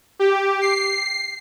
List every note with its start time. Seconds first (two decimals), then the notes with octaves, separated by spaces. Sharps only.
0.19 G4
0.61 C7